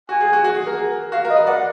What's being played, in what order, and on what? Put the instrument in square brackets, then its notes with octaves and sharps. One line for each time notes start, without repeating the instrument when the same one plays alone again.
[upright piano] F#4 [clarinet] G#5
[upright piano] G#4
F#4
F#4
G#4
A#4
[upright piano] F#4 [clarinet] F5
[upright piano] A#4
[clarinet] D#5
[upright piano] B4
[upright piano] D5 [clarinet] F#5